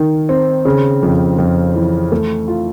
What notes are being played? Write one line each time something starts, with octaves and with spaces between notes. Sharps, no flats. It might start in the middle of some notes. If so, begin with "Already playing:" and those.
Already playing: D#3 D#4
C4
C#3
F2
F2
E3
A3
F4